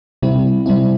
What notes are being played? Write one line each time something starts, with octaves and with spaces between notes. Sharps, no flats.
C3 G3 C4 E4
C3 G3 C4 E4